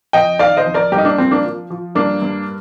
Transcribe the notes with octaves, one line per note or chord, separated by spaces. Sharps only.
F2 D#5 G5
D#3 D5 F5
C5 D#5
F2
A#4 D5
G2 G4 A#4
D#4
A#3 D4
F3 C4
A#3 D4
F3
F3
G2 A#3 D4
G2